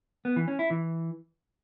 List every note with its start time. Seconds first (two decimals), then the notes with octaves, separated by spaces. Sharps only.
0.25 B3
0.36 E3
0.48 C#4
0.59 E4
0.70 E3